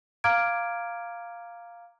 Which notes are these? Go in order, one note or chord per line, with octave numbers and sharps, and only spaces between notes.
F5 A#5 D6 F6 G#6 D7